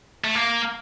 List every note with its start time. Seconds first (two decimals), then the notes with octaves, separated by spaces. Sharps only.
0.24 A3
0.35 A#3